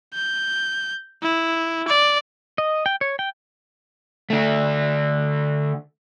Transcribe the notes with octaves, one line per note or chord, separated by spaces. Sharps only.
G6
E4
D5
D#5
G5
C#5
G5
D3 A3